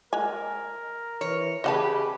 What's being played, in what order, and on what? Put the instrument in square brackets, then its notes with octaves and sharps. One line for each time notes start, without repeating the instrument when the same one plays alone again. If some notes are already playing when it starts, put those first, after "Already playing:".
[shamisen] G#3 G#5 [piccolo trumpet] A#4
[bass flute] E3 [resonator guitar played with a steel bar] C#5
[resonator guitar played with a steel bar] C#3 G4 B4 [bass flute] G#4 [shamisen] D#5 F#5 A5 [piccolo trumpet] B5